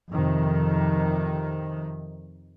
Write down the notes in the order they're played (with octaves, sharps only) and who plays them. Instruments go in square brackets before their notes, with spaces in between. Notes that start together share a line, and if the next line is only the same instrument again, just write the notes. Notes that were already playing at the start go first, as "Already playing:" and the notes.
[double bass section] F2 C3 D#3